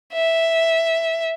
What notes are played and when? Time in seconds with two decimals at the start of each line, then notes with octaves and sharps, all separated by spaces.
0.13 E5